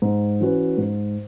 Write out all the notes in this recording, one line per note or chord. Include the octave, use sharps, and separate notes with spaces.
G#2
E3 C#4 F#4 B4
G#2